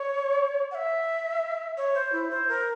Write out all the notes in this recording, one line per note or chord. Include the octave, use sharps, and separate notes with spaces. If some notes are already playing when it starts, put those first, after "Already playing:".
Already playing: C#5
F#5
E5
C#5
C5
E4
C5
A#4